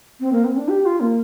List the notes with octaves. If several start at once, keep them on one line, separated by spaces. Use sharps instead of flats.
C4
A#3
C4
D4
G4
F4
A#3